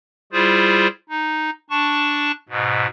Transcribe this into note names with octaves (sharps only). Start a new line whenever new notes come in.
G3 E4 F4 G#4 C5
D#4
D4 A5 C#6
G#2 B2